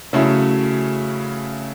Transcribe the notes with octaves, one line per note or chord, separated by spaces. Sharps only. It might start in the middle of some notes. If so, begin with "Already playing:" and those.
C#3 F#3 A3 C#4 E4